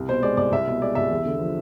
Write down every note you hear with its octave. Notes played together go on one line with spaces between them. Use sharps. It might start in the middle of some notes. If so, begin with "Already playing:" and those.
Already playing: C2
B2 C5
G#3 D5
C2 D5
C2 E5
B2
G#3 D5
C2 E5
E2
D3
F3